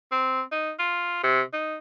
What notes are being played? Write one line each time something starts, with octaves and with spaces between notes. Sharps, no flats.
C4
D#4
F4
C3
D#4